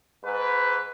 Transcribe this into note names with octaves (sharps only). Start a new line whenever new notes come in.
G#2 B4